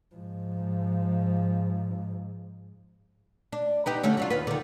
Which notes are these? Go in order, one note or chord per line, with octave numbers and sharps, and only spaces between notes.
G#2 F3
D4
B3 D#4 G4
D3 A3 C#4
F#3 D4 F4
D#2 F4 B4
D3 D#3